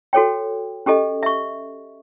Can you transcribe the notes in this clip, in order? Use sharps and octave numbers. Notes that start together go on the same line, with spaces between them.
F#4 A4 C#5 G5
C#4 G4 A4 D#5
E5 C#6